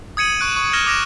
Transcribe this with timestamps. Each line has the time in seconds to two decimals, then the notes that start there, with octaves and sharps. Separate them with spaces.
0.17 D#6 G#6 C#7 D#7 F#7
0.39 C#6 F#6 D7 D#7
0.56 C#6
0.73 F6 G#6 A#6 E7 G7
0.87 D6 F6 A#6 D7 E7